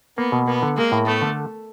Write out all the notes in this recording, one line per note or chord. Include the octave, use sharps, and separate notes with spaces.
A#3 B3
B2
A#3 B3
D3
G#3 A#3
A2
A3 B3
D3